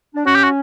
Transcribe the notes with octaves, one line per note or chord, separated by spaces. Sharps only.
D4
C#4 F#4
G4
F#4